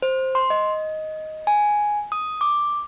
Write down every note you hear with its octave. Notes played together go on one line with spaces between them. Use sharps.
C5
C6
D#5
G#5
D#6
D6